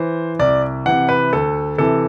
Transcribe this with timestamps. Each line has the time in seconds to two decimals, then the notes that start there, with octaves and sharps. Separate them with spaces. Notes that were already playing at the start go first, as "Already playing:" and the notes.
Already playing: E3 C5
0.39 C2 D5
0.86 C3 E3 F#5
1.09 B4
1.33 D2 A4
1.78 C3 E3 A4